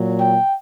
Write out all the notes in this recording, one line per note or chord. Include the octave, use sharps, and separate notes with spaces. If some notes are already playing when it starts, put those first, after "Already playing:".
Already playing: A#2 F#3
G5